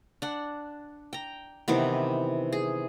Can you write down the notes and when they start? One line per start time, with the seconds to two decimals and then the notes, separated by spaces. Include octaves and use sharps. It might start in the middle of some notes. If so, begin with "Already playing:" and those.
0.22 D4 F#5
1.13 G5 A#5
1.68 C3 D#3 E3 B3
2.52 G#4